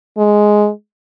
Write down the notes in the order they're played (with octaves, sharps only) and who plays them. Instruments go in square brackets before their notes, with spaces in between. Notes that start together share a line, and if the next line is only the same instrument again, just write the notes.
[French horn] G#3